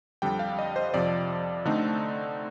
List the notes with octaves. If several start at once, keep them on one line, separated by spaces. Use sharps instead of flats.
F2 D3 G3 D4 G5
F5
D#5
C5
F2 C3 F3 D5
D3 A3 C4 D#4